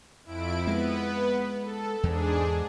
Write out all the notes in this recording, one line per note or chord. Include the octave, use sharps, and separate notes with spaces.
F2 E4 D7
G#3 B3 B4
A4
E2 G#2 D4 G#4